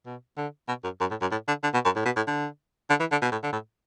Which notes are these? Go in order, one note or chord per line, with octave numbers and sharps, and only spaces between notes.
B2
D3
B2
F#2
F#2
A2
F#2
A2
D3
D3
B2
F#2
A2
B2
A2
D3
D3
E3
D3
B2
A2
D3
A2